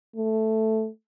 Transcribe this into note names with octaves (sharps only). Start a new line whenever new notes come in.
A3